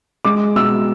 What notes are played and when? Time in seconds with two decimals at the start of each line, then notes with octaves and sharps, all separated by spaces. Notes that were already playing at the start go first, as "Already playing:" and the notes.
0.25 G#3 D6
0.56 B2 E6